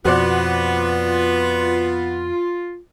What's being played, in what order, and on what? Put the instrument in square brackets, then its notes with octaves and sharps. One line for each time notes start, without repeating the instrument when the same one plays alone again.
[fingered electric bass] F2 B2 [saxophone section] B3 [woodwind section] F4 [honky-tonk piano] F#4 C5 D5